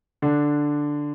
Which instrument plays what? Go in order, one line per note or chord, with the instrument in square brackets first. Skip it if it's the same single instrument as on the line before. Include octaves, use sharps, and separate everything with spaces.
[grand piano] D3 D4